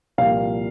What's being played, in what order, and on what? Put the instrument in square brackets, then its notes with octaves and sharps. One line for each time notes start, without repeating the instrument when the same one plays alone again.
[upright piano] C2 A#2 F3 F5